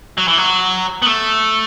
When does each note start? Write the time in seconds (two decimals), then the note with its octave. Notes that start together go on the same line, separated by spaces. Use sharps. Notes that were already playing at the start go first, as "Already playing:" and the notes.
0.18 F#3
0.28 E3
0.38 F#3
1.02 B3
1.06 A3